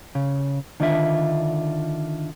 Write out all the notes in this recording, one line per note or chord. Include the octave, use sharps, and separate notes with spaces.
C#3
D3 D#3 D4 F4 C#5 E5